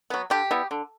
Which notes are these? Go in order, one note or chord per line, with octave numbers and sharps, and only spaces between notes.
F#3 B3
D3 G4
G3 B3 E4
D3